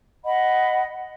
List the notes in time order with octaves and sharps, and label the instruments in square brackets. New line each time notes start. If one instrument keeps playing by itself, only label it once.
[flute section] D#5 F#5 B5